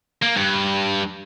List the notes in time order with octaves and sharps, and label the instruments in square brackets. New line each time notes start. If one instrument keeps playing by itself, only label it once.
[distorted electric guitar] A#3
G2